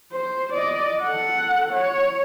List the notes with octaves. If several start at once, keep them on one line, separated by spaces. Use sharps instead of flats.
C5
D5 D#5
A4 F#5
C#5